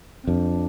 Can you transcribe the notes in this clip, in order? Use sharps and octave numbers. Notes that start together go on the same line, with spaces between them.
C4
F2 D4